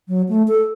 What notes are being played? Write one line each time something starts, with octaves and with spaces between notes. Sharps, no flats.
F#3
A3
A4